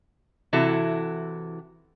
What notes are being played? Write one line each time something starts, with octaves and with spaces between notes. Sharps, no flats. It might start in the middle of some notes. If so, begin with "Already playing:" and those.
C3 E3 E4 F#4 A4